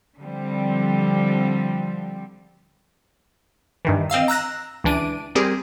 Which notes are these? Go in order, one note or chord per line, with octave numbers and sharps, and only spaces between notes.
D3 F3 G3 C4
G2 D#3 E3
C4 D#5 F5 E6
A#5 E6 F#6 A#6
C#2 E3 D4 D7 D#7
G3 C4 G4 G#4 A#4